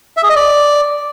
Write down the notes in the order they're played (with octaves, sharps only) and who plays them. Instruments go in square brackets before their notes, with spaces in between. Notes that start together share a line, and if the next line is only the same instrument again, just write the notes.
[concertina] E5
G#4
D#5
D5